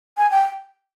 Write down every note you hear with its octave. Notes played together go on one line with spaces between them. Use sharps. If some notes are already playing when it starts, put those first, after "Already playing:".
G#5
G5